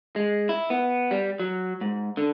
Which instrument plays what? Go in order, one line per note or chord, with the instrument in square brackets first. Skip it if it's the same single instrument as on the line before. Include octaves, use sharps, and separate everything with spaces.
[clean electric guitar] G#3
E4
B3
G3
F#3
G#2
D3